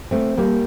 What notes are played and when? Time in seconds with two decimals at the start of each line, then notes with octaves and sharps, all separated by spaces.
0.11 A3 C4
0.38 G3 A#3